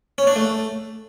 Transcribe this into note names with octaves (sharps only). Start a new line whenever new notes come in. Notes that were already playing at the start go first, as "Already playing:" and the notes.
C#4
D4
A3